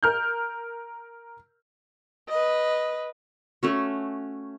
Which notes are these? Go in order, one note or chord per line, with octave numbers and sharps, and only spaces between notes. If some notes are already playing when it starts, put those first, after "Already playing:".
A#4 F6 G6
B4 D#5
A3 C#4 F#4